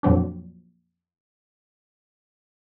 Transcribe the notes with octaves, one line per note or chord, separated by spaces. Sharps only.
F2 A#2 F#3 C4 D4